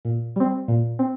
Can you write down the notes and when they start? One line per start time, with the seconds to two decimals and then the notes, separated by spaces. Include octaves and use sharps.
0.05 A#2
0.36 G3 C4
0.68 A#2
0.99 C4